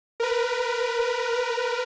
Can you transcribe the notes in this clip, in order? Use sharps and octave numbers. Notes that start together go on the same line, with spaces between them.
A#4 B4